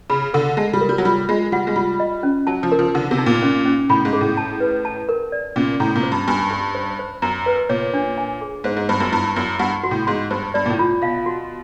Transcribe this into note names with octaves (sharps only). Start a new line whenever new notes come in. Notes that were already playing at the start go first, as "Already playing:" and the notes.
C#3 B5
D3 A4
G#3 A5
G3
A#4
G3
F#3
G3 F4
G#3 F4
G3 F#5
G#3
G3 F4
D#5
C#4
F#3 A5
F3
A#4
F3
D3 D#4
C3
D#4
A#2
C#4
C#4
A2 B5
G#2
G#4
A2
A5
B4
A5
A#4
D5
A#2 C#4
A2 A#5
A#2
C5
G2
G2 G#5
G4
C5
C5
F#2 A#5
B4
A#2 C#5
D4
G#5
G#4
G#2 C5
G#2
G2 C5
F#2
G2 E4
F#2 E4
G2 F#5
F#4
A2
G#2 C6
G2 C5
G2 D5
A#2
A2
F4
B2 F5
F#4